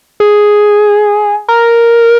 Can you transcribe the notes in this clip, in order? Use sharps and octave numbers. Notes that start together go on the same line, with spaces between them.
G#4
A#4